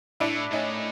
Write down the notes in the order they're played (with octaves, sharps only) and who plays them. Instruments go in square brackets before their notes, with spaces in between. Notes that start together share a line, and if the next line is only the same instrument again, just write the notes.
[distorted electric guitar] A2 [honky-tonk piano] D4 E4
[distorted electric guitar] A2 [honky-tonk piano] C#4 D#4